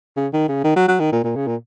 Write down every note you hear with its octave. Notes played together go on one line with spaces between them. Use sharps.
C#3
D#3
C#3
D#3
F#3
F#3
D#3
A#2
A#2
C#3
A#2